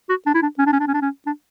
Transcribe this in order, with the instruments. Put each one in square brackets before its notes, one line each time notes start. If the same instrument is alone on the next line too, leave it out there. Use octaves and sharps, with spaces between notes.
[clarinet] F#4
D4
E4
D4
C#4
D4
C#4
D4
C#4
D4
C#4
D4